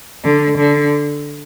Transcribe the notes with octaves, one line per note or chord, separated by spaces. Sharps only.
D3
D3